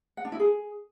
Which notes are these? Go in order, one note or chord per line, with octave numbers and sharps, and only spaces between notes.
F#5
D4
E4
G#4